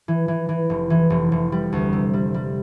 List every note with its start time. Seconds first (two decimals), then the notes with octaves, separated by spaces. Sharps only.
0.08 E3
0.28 E3
0.49 E3
0.70 F1
0.90 E3
1.10 F1
1.32 F1
1.52 G3
1.72 D2
1.93 C3
2.13 G3
2.34 G3